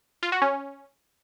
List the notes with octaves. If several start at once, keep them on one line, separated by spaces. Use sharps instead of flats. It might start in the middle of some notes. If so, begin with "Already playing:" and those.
F4
F#4
C#4